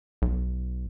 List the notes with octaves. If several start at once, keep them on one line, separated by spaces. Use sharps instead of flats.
B1